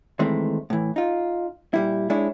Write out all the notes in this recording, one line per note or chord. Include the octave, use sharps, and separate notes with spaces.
D#3 E3 G#3 A3 C4
A2 E3
D#4 F4
A#2 G3 E4
G#3 D4 E4 C#5